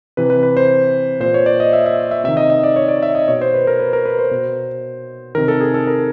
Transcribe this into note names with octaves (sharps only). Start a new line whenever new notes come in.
C3 E3 B4
B4
B4
C5
A#2 C5
C#5
D5
D#5
E5
E5
E5
C3 D#3 E5
D#5
D#5
D5
C#5
D5
E5
D#5
B2 C#5
C5
B4
A#4
B4
A#4
B4
C5
B2
C3 D#3 A#4
A4
G#4
A4
A#4